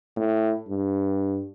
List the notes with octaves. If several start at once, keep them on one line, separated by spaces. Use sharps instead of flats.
A2
G2